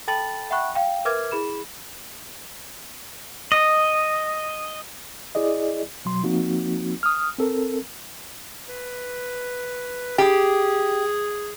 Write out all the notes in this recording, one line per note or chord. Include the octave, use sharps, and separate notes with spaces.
A4 G5 A5 B5 A6 F#7
E5 F#5 G5 B5 C#6 F#6
F5 G5
A#4 B4 E5 D6 F6 G#6
E4 G#4 B5 E7
D#5
E4 G#4 D5 D#5
B2 F#3 C6
F3 A#3 C4 D#4 F#4
D#6 F6
C4 A4 A#4
B4
G4 G#4